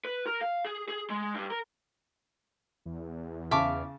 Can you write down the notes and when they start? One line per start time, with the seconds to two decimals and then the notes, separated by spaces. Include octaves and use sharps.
0.05 B4
0.26 A#4
0.41 F5
0.65 G#4
0.88 G#4
1.10 G#3
1.34 G2
1.51 A#4
2.86 E2
3.51 C#3 E5 F5 A5 C#6 D6